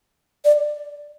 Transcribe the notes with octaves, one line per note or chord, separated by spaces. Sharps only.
D5